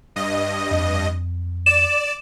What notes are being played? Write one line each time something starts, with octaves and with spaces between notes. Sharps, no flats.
G2 D#5
F2
D5 E7